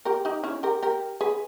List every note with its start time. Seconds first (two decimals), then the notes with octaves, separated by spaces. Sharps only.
0.05 G4 A#4
0.25 D#4 G4
0.44 C#4 E4
0.63 G4 A#4
0.83 G4 A#4
1.21 G#4 B4